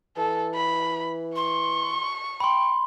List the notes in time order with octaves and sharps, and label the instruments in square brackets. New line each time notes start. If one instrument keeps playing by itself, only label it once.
[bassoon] E3 [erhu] A4
[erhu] B5
[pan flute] C6 [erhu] C#6
[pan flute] G5 [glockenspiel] B5 C6